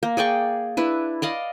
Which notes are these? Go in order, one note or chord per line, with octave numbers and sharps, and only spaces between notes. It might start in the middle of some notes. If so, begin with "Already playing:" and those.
A#3
G#4 D5 G5 C#6
D4 E4 B4
D5 D#5 F5